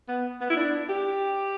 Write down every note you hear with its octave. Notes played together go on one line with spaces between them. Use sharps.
B3
B3
E4
D4
G4